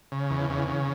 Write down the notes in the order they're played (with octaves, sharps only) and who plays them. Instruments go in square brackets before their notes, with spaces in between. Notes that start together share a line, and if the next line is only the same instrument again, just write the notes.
[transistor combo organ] C#3
E2
C#3
C#3